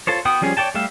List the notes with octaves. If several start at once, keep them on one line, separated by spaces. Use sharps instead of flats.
F4 A4 C5 C#5
B3 F#4 G5 D#6
F3 G3 C#4 G#4
C#5 D5 G5 A5
G3 A3 G4 E5 F5